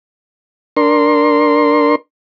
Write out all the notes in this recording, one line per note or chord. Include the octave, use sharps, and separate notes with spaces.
D4 A#4 C6